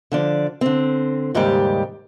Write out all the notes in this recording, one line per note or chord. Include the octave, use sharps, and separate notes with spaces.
D3 F3 D5
D3 C4
D#2 G#2 C#3 G3 G4